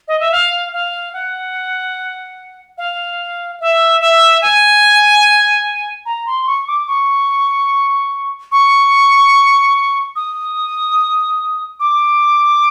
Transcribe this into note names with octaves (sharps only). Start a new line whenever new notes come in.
D#5
E5
F5
F5
F#5
F5
E5
E5
G#5
A#5
C6
C#6
D6
C#6
C#6
D#6
D6